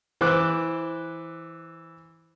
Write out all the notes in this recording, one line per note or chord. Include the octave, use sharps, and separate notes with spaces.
E3 C5 D6 F#6